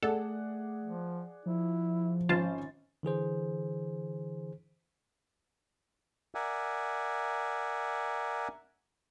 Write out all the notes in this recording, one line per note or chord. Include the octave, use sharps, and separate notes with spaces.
A3 G#4 A4 D5 F#5
F3
F3 E4
G#1 C#4 F4 C5 A5 A6
D3 E3 G#4 C5
A#4 D5 E5 F#5 G#5